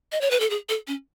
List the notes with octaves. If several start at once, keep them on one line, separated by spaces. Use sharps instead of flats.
D#5
C#5
B4
A4
G#4
A4
C#4